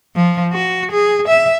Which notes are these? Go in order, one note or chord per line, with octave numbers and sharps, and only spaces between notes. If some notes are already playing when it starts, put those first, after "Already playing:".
F3
F#4
G#4
E5